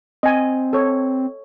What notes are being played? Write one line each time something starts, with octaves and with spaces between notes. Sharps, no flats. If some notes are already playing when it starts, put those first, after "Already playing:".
C4 D#5 G#5
A4 C#5